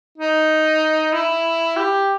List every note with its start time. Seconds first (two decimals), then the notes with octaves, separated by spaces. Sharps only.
0.18 D#4
1.13 E4
1.76 G4